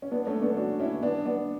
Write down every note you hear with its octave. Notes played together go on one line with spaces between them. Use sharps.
C#4
B3 D4
A3 C#4
B3 D4
D4 F#4
C#4 E4
B3 D4
B3 D4